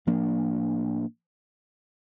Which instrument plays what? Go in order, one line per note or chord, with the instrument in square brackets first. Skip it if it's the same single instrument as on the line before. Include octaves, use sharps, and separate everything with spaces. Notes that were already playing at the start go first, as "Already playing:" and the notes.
[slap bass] A2 F3 A#3 D4